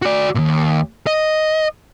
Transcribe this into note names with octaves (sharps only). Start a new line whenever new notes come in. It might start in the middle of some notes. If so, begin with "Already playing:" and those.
F#4 D5
D#2 A#2
D#5